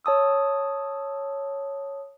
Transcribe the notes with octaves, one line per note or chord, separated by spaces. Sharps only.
C#5 A5 D#6 E6